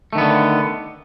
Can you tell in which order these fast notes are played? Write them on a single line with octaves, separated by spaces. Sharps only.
A3 D#3 B3 D3